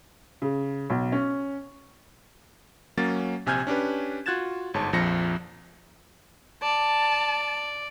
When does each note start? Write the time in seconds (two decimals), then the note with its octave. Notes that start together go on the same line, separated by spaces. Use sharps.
0.42 C#3
0.90 B1
1.12 C#4
2.97 F#3 A#3 C#4 A6
3.46 A#1 C3 G#5 F6 G6 G#6
3.67 C#4 D4 G4 B4
4.26 F4 F#4 F#6 G#6 A6 E7
4.74 G1 G#2 C#5 A5
4.93 A#1 F2 F3 C4 A#6 C#7
6.62 D5 A5